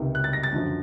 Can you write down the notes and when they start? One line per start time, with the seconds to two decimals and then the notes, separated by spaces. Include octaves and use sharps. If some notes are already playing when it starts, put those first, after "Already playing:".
Already playing: C#2 C3 D#3
0.15 F#6
0.24 A6
0.33 A#6
0.43 A6
0.52 F#2 D3 F3